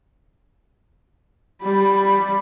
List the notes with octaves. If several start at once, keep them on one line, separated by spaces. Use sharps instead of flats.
G3 B5